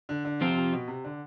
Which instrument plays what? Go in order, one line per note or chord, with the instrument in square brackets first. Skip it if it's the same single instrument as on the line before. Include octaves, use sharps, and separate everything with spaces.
[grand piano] D3
D3
[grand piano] C3 [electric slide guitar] F3 C4 F4
[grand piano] C3
B2
C3
D3